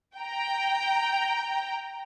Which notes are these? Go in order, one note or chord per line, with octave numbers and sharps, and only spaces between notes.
G5 A#5